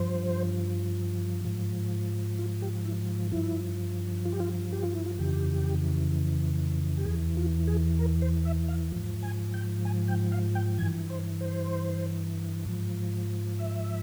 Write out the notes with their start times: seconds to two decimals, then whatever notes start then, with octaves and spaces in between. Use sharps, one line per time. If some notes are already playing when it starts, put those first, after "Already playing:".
Already playing: G2 F3 C5
1.45 G#2 F3
2.39 F4
2.62 G4
2.85 E4
3.32 G2 F3 E4
4.25 F4
4.32 G4
4.40 F4
4.72 G4
4.83 F4
4.95 E4
5.06 F4
5.19 F2 C#3 E3 G4
6.97 G4
7.05 E2 E3 G#4
7.37 F4
7.67 G#4
7.99 A#4
8.22 C5
8.45 E5
8.68 F5
8.92 G#2 F3
9.23 G#5
9.54 G5
9.85 G#5
10.08 G5
10.32 F5
10.55 G5
10.78 G2 E3 G#5
11.10 C5
11.41 C5
12.66 G#2 F3
13.59 E5